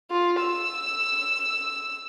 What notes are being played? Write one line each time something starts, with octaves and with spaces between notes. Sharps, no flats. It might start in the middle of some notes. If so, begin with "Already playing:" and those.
F4
E6